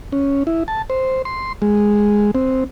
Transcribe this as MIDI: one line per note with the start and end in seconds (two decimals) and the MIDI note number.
0.12 0.43 61
0.47 0.63 64
0.68 0.82 81
0.90 1.22 72
1.25 1.53 84
1.62 2.31 56
2.35 2.64 60